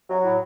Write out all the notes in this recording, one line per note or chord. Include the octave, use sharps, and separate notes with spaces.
F#3
A2